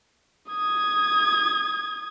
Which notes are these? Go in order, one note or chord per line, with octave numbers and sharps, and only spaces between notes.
D#6 G#6